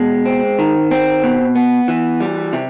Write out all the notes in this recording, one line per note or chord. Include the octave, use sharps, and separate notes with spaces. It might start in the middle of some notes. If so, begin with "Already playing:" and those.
Already playing: B2 G#3
C4
D#3
C4
B2
B3
E3
G3
C3